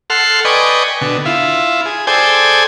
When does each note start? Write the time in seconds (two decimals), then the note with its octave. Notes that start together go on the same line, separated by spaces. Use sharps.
0.10 A4 F#5 C6 F6
0.45 B4 D5 D#5 G5 G#5 C#6
1.01 B2 D3
1.25 E4 F4
1.86 G#4
2.07 G#4 A4 C5 D5 G5 G#5